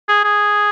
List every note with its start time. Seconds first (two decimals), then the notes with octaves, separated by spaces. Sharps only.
0.09 G#4
0.24 G#4